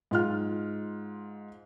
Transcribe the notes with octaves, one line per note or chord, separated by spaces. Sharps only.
G#2 F4 F6